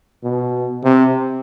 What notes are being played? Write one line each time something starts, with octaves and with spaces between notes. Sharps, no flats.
B2
C3